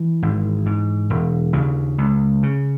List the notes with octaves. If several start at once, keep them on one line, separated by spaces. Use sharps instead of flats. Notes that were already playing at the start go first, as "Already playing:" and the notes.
Already playing: E3
G#1
G#2
E1
D#2 C#3
C#2
C#3